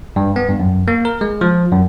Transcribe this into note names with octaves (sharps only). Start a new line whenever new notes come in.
G2
B3
G2
F#2
A#3
A#4
G#3
F3
F#2